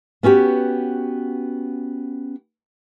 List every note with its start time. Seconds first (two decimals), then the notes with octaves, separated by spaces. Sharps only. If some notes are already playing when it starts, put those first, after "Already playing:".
0.23 B3 C#4 F#4 G4